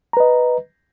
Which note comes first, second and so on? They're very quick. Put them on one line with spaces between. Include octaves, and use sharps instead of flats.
A#5 B4 D#5